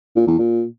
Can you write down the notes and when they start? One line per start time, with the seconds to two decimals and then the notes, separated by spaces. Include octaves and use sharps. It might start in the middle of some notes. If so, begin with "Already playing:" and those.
0.16 A#2
0.27 E2
0.39 A#2